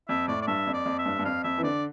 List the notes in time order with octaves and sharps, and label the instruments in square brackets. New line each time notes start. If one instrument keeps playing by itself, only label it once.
[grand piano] F2 [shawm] E5
[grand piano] A2 [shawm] D5
[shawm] D5
[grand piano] G2 [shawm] E5
[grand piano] F2
[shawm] D5
[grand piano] F2
[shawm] E5
[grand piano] G2
G2
[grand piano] F2 [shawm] F5
[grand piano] F2 [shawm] E5
[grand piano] E3
[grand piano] D3 [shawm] D5